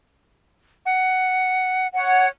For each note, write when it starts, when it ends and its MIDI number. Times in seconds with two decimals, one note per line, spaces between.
0.86 1.87 78
1.95 2.28 73
1.95 2.28 78